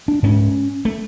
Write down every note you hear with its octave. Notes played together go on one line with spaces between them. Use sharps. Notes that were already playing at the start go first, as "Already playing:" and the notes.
D4
G#2 C#4
A3